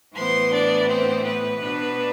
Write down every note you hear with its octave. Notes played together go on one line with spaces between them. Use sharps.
A2 E3 B3 C5 C6
D4 D5
C4 C5
B3 B4
B2 B3 D4